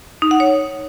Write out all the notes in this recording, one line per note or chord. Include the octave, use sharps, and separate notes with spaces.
D#4
F#5
C#5